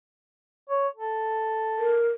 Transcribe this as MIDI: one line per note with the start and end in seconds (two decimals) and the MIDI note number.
0.70 0.88 73
0.96 1.99 69
1.78 2.09 70